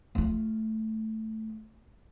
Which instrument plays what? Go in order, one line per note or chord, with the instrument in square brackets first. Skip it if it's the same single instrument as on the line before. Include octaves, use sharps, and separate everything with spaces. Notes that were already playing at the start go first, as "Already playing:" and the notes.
[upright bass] A3 F4